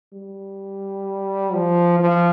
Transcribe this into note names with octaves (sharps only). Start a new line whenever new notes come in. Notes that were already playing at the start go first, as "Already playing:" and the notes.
G3
F3
F3